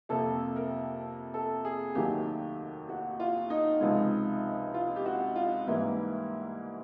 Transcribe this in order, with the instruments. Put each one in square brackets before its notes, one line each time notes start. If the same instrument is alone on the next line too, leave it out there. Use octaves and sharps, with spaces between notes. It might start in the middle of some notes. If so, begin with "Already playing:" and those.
[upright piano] F2 C3 F3 A#3 A4
A#4
A4
G#4
D#2 D#3 F#3 A3 G4
F#4
F4
D#4
C#2 C3 F3 G#3
F4
G4
F#4
F4
G#2 E3 G3 A#3 E4